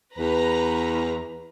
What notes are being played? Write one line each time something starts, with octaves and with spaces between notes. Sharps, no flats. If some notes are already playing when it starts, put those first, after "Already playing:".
E2 B4 A#5